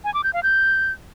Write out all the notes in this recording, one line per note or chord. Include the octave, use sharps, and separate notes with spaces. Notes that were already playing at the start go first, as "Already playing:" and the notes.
G#5
D6
G6
F5
G6